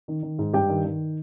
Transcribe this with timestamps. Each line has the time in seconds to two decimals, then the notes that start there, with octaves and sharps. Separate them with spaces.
0.08 D#3
0.22 D#3
0.39 G#2
0.53 G2 G4 G5
0.69 D#3
0.85 D#3